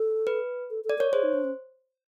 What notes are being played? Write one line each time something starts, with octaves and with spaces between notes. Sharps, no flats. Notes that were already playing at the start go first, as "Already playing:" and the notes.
Already playing: A4
B4
A4
A4
D5
A#4 C#5
G#4 C5
D#4
D4
C#4